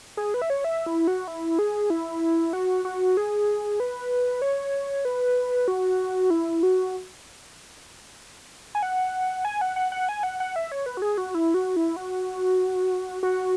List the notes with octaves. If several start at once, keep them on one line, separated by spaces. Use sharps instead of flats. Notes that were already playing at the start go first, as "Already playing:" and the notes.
G#4
B4
E5
C#5
E5
E4
F#4
E4
G#4
E4
F#4
F#4
G#4
B4
C#5
B4
F#4
E4
F#4
G#5
F#5
G#5
F#5
F#5
F#5
G#5
F#5
F#5
E5
C#5
B4
F#4
G#4
F#4
E4
F#4
E4
F#4
F#4